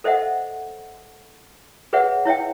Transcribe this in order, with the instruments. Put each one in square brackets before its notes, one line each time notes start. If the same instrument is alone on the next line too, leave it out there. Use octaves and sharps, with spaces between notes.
[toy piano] A4 C5 D#5 E5 F#5
G#4 B4 C#5 E5 F#5
E4 C#5 E5 G5